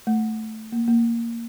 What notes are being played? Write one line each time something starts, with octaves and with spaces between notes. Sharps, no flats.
A3
A#3
A#3